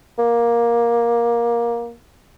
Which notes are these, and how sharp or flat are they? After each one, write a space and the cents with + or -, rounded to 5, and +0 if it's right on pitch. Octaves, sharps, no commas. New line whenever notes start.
A#3 +15